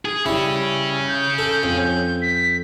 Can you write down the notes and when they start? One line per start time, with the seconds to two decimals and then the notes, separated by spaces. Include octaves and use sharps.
0.05 G#4
0.26 G3 C#4 E4 G#4
1.08 G6
1.38 A4
1.63 F2
2.22 B6